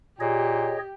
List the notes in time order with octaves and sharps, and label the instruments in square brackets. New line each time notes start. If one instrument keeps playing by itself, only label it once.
[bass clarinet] A#2 [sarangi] G4 [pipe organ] G#4 C#5 D#5